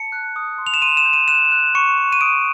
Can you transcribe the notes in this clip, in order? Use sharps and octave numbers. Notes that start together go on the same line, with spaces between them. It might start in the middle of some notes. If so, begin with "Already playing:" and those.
Already playing: A5 C#7
F#6
D#6
C6
F7
E7
C6 D#7
E7
G6
D#7
F#6 E7
F#6
C#6 C#7
C#6
D#7
D#6 D7